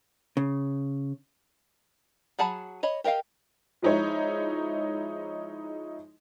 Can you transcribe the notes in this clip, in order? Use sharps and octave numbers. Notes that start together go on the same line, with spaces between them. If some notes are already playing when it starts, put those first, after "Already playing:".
C#3
F#3 G#4 F#5 A5 B5
C#5 D#5 B5
G4 A#4 D#5 F5 G5
F3 G#3 D#4 E4 C#5